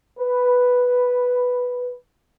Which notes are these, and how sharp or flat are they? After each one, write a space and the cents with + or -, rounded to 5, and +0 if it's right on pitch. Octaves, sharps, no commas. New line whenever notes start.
B4 +0